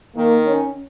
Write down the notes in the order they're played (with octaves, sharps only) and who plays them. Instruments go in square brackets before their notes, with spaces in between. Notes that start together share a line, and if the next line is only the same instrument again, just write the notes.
[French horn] D#3 [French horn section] A#3
[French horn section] C#4